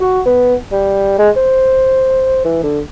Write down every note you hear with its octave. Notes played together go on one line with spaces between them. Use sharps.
F#4
B3
G3
G#3
C5
E3
D3